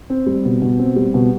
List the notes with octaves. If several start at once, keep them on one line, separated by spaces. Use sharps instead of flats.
C4
G3
B2
B2
C4
G3
B2